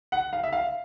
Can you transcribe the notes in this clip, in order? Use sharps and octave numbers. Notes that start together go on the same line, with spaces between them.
F#5
F5
E5
F5